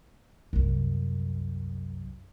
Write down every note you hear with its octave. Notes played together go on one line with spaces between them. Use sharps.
C2 F#2